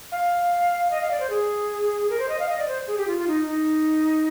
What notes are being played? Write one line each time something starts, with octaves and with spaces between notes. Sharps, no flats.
F5
D#5
F5
D5
C5
G#4
A#4
C5
D#5
F5
D#5
D5
C5
G#4
G4
F4
F4
D#4
D#4